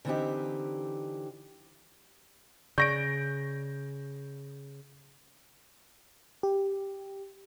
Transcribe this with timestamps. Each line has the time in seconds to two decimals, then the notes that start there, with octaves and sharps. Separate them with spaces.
0.05 D3 E3 B3 C4 D#4 G4
2.78 C#3 D5 C#6 G6 A#6 D7
6.43 G4